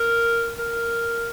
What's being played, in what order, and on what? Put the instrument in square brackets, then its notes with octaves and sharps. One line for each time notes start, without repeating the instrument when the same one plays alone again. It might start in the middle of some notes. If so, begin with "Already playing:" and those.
Already playing: [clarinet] A#4
A#4